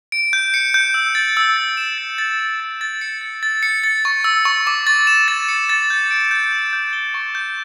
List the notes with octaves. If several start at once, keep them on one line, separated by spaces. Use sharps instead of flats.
D7
G6
C#7
G6
E6
A6
E6
A6
E7
A6
A6
E7
A6
A6
C#7
A6
A6
C#7
A6
C#6
E6
C#6
D6
A6
E7
A6
C#7
A6
G6
D7
G6
E6
G6
G7
C#6
G6